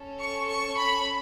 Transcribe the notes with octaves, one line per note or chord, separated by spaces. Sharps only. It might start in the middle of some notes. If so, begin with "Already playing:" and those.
Already playing: C#4 A4
C#6
C#6
B5